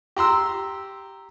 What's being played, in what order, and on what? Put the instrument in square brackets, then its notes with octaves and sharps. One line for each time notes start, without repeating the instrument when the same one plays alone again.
[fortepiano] G4 A#5 C6 E6